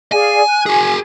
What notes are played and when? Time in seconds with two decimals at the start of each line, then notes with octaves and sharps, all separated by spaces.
0.12 G#4 D5 F5 G#5
0.48 F#6
0.66 F#4 G#4 G#5